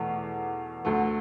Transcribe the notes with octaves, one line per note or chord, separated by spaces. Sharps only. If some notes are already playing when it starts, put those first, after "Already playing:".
Already playing: E2 B2 A3
D2 D3 A3